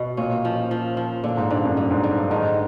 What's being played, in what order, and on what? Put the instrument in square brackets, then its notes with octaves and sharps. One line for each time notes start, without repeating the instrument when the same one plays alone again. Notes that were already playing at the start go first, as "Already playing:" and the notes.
Already playing: [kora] B2
[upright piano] A#2 [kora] C#4
[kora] F3
F3
F3
[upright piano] A#2 [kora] D3
[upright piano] G#2
[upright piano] G2 [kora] D3
[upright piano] F#2
[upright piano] G2 [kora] D3
[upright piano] G#2
[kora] D3
[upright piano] G2
[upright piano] G#2 [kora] D#3